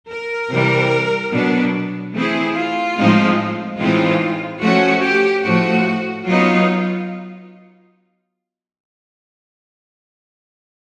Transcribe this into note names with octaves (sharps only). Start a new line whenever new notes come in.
A#4
C3 E3 G3
B2 F#3 B3 D4
E3 A3 C4 E4 G#4
F4
A2 F3 G#3 C4 D#4
A2 E3 G#3 C4 D#4 F4
F3 A3 C#4 F#4
G4
A2 F3 A3 F#4
F#3 B3 D#4 F4